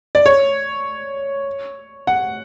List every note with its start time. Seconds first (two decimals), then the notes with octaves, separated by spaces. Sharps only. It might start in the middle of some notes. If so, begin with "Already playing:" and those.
0.15 D5
0.26 C#5
2.07 F#5